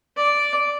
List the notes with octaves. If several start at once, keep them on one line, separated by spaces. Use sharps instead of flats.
D5